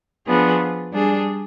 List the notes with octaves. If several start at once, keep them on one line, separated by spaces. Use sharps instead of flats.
F3 B3 D4 G#4
G3 D4 G#4